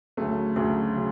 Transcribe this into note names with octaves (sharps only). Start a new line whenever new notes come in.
D2 C#3 F#3 A3
D2 C#3 F#3 A3
C#3 F#3